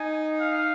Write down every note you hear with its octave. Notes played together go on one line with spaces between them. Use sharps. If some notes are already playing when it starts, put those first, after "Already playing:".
Already playing: D#4 G#5
F5